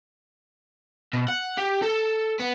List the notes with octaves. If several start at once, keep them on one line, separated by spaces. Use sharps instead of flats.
B2
F#5
G4
A4
B3